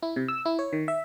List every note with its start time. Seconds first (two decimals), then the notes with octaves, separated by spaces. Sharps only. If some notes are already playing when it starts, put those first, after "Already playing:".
0.03 E4
0.16 C3
0.28 E6
0.45 E4
0.59 C#5
0.73 D#3
0.88 E5